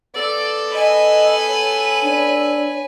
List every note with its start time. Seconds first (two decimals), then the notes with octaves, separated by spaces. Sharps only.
0.15 B3 A4 D5
0.74 B4 D#5 G#5
1.48 C#5
2.04 D4